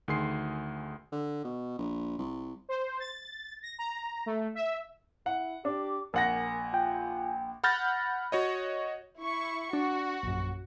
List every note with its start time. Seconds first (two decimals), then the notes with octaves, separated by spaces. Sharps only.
0.08 D2 D#3 G#4 C6 C7
1.12 D3
1.44 B2
1.78 A#1
2.18 C2
2.69 C5
3.00 A6
3.63 A#6
3.79 A#5
4.26 A3
4.55 E5
5.26 E4 F#5
5.65 D4 G4 D6
6.14 A#1 A#4 F#5 G#5 A#6
6.74 F4 G5
7.64 F#5 B5 F6 G6 A6 A#6
8.32 F#4 C#5 D#5
9.19 E4 C#6
9.73 D4 F#4
10.23 A#1 F#2